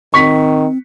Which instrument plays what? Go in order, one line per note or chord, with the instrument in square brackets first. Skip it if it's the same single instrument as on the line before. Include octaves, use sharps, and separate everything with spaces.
[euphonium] D#3 [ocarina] C4 [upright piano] C#6 B6